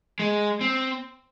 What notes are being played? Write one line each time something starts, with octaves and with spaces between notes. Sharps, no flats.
G#3
C4